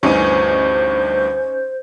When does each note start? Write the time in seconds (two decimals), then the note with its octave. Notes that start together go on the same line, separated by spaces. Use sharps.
0.03 D2 G2 E3 C#4 D#4 C5 G#5